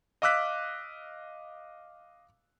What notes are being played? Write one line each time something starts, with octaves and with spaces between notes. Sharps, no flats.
D#5 F5 D6 E6 F#6 B6